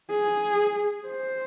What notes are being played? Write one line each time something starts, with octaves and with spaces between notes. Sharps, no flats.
G#4
C5